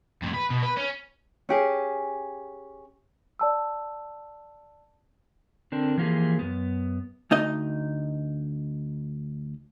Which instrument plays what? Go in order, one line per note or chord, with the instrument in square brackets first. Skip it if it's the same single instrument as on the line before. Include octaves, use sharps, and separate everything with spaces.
[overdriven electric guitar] F2 A2
B4
B2
B4
C#4
[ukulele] C#4 G4 G#4
[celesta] D5 A5 E6
[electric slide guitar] D3 C4 D4 A#4
E3 F3 A#3 F4 G4 G#4
F#2 B3
[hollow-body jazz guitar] D2 D#4 D#5